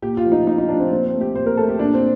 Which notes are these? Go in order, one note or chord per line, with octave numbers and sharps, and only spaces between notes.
A#2 G4
F4
F3 A3
D#4
A#2 D#4
D#4
F3 A3 D4
C4
A#2 C4
C4
A3
G4
A#2 C5
A#4
A3 A4
G4
A#2 D4
C4